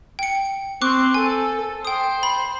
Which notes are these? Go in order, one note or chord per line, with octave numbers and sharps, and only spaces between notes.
G5 C#7
C4 C#6 D6 F#6
A4 G#5
C5 G5 D#6
B5